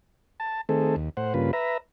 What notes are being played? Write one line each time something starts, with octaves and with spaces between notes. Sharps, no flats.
A5
D#3 A3 C4 G#4 A4
D#2
A2 C5 F#5
G2 C#3 A#3 F4 B4
B4 E5 A#5